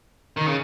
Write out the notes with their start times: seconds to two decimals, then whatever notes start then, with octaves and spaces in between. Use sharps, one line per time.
0.37 D#3
0.46 C#3